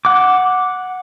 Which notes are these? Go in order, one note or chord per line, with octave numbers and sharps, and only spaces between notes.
F#5 D6